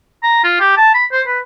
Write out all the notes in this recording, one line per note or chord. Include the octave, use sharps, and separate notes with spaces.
A#5
F4
G4
A5
B5
C5
B4